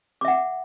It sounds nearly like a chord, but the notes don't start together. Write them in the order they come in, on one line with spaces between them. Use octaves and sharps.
D6 E5 F#5